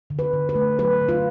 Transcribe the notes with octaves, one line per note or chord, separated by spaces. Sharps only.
D3
B4
D3
B4
A3
F#3 B4
D3
F4